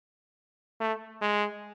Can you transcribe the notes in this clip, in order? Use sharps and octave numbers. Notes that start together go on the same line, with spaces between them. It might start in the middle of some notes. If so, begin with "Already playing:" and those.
A3
G#3